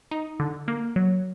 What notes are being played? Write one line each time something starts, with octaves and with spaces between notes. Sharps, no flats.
D#4
D3
A#3
F#3